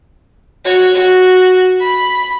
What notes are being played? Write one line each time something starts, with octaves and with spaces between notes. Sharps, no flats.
F#4 C#5
F#4
B5